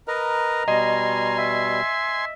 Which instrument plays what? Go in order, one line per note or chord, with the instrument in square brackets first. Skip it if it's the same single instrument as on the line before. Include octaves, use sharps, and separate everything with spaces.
[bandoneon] A#4 B4 D#5 [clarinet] A#5
[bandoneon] B2 G3 [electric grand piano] D#5 [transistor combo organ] G#5 C6
[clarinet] E5